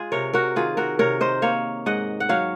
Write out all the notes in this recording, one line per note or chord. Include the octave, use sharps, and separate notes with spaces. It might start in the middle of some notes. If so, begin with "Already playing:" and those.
Already playing: G#3 F4 G#4
C3 A#4 C#5
F#4 A#4
D#3 F4 G#4
F#4 A#4
C3 A#4 C#5
C5 D#5
A#3 C#5 F5
G#2 D#5 F#5
F#5
F#3 C#5 F5